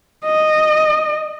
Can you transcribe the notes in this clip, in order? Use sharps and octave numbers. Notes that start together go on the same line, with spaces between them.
D#5